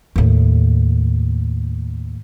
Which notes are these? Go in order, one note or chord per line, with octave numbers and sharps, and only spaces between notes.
D#2 A2